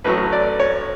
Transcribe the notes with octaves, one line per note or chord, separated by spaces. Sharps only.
A1 A2 F#3 A3 B4
D5
C#5